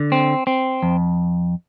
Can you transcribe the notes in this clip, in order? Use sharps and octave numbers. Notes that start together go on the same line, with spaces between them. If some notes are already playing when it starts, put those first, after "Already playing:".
Already playing: D3
C4
C4
F2